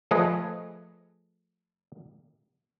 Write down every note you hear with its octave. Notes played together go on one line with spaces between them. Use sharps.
F3 A3 G#4 B4 D#5